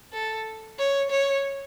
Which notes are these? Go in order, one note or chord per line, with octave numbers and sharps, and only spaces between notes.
A4
C#5
C#5